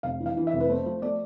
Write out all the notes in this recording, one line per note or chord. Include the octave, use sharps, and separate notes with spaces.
F1 F5
E3
F5
E3
E5
F1
B4
A3 C5
F3
A3 D5